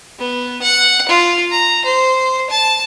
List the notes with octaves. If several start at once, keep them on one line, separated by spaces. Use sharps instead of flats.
B3
F#5
F4
A#5
C5
A5